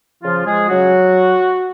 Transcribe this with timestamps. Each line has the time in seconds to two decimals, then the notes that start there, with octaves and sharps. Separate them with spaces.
0.22 C#3 F3 F4
0.46 F3 G#3 G#4
0.69 C#3 F#3 F#4